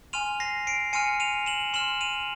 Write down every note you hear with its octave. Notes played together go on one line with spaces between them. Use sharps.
G#5 C6 F6 D#7 F7
A#6 C7
C7 D7
G#5 C6 F6 C#7 D#7
D#7 F7
E7 F#7
C6 F6 E7 F#7
D#7 F7